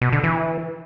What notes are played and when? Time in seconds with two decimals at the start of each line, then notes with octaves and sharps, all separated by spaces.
0.02 B2
0.13 D3
0.24 E3